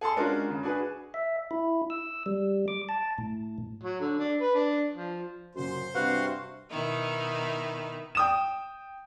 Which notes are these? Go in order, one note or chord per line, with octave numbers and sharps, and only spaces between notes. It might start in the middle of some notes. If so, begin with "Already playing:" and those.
G#4 A4 A5 C6
G#3 C#4 D4 F4 F#4 A#4
C#3
D4 F#4 G#4 B4
E5
E4
E6
G3
D6
A5
A2
F#3
D3
D4
B4
D4
F3
F#2 A#2 C#3 F#4 C5 C6
G2 C3 F#4 B4 F5 F#5
B2 D#3 D#4 E4
G5 D#6 E7